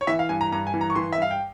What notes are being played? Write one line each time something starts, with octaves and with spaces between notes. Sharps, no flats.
C#5
E3 E5
F5
G2 G#5
A#5
G2 A#5
G#5
E3
A#5
C#6
E3 C6
E5
G2 F5
G5